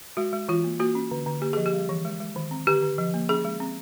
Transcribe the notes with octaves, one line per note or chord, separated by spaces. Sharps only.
G#3 F#4
G#3
E3 F4
A#3
A#3 F#4
C#4
D3
D3
A#3 G4
F3 G#4
G4
G3
E3
G#3
G#3
D#3
C4
D3 G4
D3
F3
A#3
C#4 G#4
G#3
C4